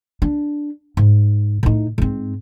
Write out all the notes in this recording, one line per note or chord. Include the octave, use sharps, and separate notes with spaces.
D4
G#2
A2 D#4
G#2 C4